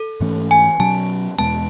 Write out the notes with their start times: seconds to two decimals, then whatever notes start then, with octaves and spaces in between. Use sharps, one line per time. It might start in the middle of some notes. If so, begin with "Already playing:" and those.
Already playing: A4
0.20 G#2 E3 A3 C#4
0.51 G#5
0.79 B2 F#3 C#4 A5
1.38 E2 B2 G#3 B3 A5